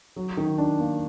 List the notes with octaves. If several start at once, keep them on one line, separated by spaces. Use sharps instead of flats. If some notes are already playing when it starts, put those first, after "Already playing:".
F#3
D#3
D4
A#3